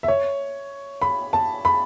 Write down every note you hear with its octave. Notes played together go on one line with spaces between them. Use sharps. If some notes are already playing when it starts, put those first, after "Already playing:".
E5
C#5
B5
A5
B5